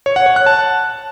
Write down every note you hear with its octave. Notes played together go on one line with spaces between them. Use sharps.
C#5
F#5
C#5
F#6
A5